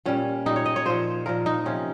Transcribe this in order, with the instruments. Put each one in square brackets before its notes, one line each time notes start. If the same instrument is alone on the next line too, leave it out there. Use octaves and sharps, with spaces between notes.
[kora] A#2 G3 C#4
A#2 G3 D#4
C#5
D#5
C#5
A#2 F3 C5
A#2 F3 A#4
D#4
C3 F3 C#4